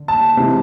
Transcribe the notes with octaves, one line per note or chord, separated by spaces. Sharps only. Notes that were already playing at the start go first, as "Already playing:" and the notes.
Already playing: D3
A5
C3 E3 G#3